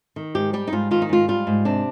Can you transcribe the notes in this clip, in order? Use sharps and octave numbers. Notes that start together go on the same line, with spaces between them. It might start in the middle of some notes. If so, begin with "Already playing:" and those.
D#3
G#2 G4
G3 G4
D#4
G#2 F4
D#3 F4
D#4
G#2 F4
G3 F4
G#2
C3 D4